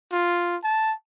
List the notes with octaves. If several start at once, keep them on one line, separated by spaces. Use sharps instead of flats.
F4
A5